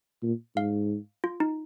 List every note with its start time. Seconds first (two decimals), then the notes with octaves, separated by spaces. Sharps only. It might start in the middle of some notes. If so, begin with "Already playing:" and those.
0.23 A#2
0.56 G#2 F5
1.24 F4
1.40 D#4